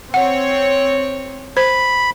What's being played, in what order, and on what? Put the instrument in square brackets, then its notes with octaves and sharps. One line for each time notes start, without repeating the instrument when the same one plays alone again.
[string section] C4 C#5 [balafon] F#5
[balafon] C5 [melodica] B5